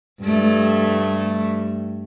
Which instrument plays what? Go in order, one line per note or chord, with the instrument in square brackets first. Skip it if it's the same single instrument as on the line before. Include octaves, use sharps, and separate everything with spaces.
[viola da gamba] G2 A3